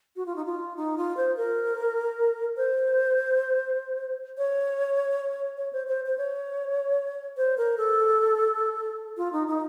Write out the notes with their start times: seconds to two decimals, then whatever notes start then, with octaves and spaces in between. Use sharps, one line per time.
0.16 F#4
0.26 F4
0.36 D#4
0.45 F4
0.77 D#4
0.97 F4
1.17 C5
1.37 A#4
2.57 C5
4.38 C#5
5.57 C#5
5.73 C5
5.87 C5
6.06 C5
6.18 C#5
7.37 C5
7.58 A#4
7.78 A4
9.17 F4
9.32 D#4
9.47 D#4